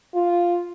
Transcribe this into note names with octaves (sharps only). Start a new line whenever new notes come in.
F4